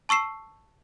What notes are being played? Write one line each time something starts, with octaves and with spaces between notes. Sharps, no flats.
A5 C#6 E6 C7 E7